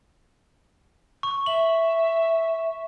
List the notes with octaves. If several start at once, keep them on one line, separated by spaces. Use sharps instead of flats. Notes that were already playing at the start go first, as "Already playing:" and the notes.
C#6
E5 F#7